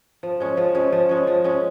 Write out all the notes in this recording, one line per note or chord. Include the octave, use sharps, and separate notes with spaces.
F3
G#3 C#4
F3
G#3 C#4
F3
G#3 C#4
F3
G#3 C#4